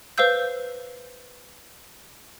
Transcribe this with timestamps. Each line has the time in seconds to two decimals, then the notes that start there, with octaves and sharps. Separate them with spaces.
0.18 B4 C5 F5 E6 G6